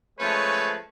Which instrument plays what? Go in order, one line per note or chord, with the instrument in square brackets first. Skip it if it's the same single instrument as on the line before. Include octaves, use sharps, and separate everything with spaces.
[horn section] F3 G#3 A3 C#4 B4 C#5